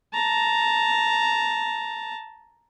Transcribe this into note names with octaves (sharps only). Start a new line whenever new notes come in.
A5 A#5